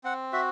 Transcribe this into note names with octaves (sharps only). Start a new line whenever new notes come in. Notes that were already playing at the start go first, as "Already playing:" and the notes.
C4 F#5
F#4 E5